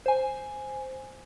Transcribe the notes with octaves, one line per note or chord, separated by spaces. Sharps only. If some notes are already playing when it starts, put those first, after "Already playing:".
C5 G#5